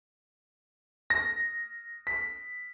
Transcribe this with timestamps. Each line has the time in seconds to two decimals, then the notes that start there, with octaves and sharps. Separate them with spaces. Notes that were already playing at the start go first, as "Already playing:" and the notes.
1.10 A#6
2.07 B6